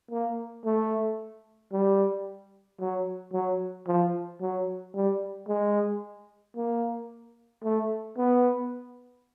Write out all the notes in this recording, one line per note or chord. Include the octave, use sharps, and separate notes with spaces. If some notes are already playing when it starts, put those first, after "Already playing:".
A#3
A3
G3
F#3
F#3
F3
F#3
G3
G#3
A#3
A3
B3